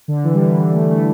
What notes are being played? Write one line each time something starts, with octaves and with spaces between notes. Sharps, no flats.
D3
E3
G3
E3
D3
A3
A3